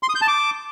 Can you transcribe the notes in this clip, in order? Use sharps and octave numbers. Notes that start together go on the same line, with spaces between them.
C6
D#6
G6
A5
D6